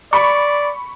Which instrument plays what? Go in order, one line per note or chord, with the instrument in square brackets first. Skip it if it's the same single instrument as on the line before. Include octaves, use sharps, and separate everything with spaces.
[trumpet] D5 [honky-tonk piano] B5 C#6